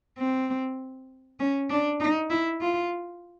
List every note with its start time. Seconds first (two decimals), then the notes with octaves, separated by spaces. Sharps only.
0.18 C4
1.40 C#4
1.70 D4
2.00 D#4
2.30 E4
2.61 F4